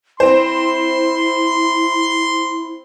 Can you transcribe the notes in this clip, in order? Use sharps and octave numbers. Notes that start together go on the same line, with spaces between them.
C4 E4 C5 C6